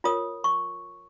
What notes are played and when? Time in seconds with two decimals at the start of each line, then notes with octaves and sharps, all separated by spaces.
0.04 F4 A#4 C#5 D#6
0.44 C#6